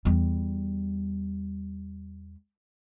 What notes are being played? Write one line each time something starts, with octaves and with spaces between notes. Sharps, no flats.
E2 G3